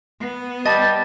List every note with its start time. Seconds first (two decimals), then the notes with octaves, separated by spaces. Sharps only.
0.20 B3
0.66 G3 D#5 A5 A6